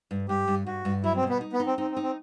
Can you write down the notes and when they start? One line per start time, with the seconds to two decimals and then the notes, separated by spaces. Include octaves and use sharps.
0.11 G2
0.29 G2 G4
0.48 G2
0.66 G2 F#4
0.85 G2
1.04 F#3 E4
1.16 C4
1.23 B2
1.29 B3
1.41 D#4
1.53 B3
1.60 D#4
1.66 C4
1.78 C4 D#4
1.90 C4
1.97 D#4
2.03 C4